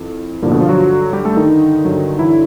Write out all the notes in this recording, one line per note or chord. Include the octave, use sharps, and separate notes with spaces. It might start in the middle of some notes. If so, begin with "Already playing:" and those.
Already playing: F2 E3
G2 A#2 D3 F3 A#3
B2 B3
F3 F4
F#3 F#4
G3 G4
A3 A4
D#3 D#4
G2 D3 F#3
E3 E4